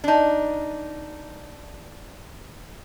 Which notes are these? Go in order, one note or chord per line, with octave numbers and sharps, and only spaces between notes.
D4 D#4